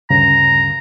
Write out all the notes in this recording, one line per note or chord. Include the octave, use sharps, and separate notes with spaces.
D2 G2 C#3 A#5